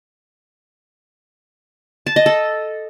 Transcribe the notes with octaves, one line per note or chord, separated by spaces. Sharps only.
A5
D#5
A4